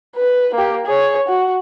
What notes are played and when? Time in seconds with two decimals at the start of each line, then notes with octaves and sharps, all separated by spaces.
0.16 B4
0.55 A#3 G4
0.86 G#4 C#5
1.28 F#4